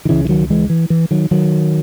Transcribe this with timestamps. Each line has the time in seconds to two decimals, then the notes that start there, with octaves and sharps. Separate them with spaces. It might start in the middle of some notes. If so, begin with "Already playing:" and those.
0.05 D#3
0.09 C#2 C#3 E3
0.25 E3
0.29 D#3 F#3
0.50 E3 G#3
0.70 E3
0.90 E3
1.11 D#3 F#3
1.31 D#3 F#3